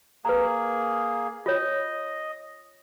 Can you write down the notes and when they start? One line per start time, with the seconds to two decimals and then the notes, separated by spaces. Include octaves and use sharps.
0.25 A#3 G#4 B4 A#5
1.46 F4 C#5 D#5